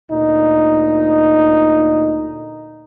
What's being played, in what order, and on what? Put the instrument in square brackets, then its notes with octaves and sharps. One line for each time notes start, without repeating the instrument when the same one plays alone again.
[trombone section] D2 A#2 D#4